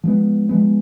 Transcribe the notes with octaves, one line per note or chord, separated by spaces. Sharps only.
F3 G#3 B3
F3 G#3 B3